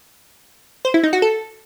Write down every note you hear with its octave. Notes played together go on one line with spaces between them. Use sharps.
C5
E4
D#4
F#4
A4